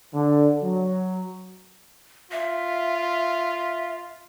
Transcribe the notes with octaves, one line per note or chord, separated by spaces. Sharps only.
D3
F#3
F4 E5